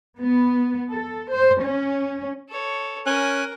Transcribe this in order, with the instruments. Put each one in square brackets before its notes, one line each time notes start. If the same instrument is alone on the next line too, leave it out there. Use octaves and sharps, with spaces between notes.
[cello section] B3
A4
C5
C#4
[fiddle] A4 C#5
[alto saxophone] C#4 [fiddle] A#4 [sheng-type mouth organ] G#5 F#6